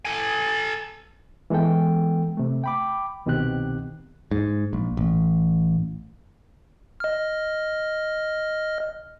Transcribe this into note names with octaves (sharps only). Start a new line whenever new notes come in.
A4 G#5
E3 G#3 B3 A4 G5
C3 A3
G5 B5 D6
C2 B2 D#3 C4 G4 F#6
G#2
A#1
A1
D#5 F6